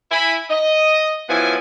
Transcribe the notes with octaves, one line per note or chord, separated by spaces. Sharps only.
E4 G#5 B5
D#5
F#2 F3 B3 E4 G#5